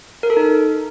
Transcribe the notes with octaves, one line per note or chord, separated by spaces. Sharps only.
A#4
A4
D#4